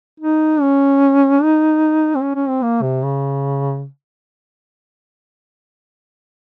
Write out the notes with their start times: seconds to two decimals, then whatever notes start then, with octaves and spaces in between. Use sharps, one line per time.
0.20 D#4
0.61 C#4
1.42 D#4
2.15 C4
2.22 C#4
2.35 C#4
2.48 C4
2.62 A#3
2.82 C3
3.03 C#3